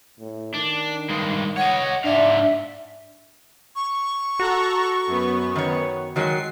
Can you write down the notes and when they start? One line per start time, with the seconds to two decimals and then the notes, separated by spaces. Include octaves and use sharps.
0.20 A2
0.55 D#3 D4
1.10 G2 G#3
1.57 C#5 D#5 F#5
2.05 G#2 D4 E5 F5
3.76 C#6
4.40 F#4 A4 F#5 A#5
5.07 F#2 B3
5.56 D#3 C#5
6.16 D#3 F#3 G#3 C7